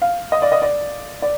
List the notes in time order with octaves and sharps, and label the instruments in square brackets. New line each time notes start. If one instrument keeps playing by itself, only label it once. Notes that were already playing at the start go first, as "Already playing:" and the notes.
[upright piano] F5
D#5
D5
D#5
D5
D5